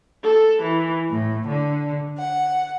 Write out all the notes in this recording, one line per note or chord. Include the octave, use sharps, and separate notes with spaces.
A4
E3
A2
D3
F#5